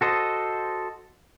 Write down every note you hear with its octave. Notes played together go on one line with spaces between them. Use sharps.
F#4 A4 C5 D#5